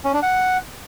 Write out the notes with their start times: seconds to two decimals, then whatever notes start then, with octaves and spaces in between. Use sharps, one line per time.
0.04 C#4
0.14 D4
0.23 F#5